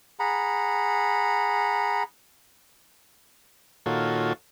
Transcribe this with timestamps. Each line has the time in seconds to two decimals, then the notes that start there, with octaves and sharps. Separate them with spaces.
0.19 G#4 F#5 A#5 B5
3.86 A#2 D#3 F4 F#4 A4 C#5